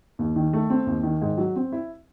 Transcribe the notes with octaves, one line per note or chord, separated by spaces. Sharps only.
D#2
D#3
A3
C4
D#2
D#3
G#2
F#3
C4
E4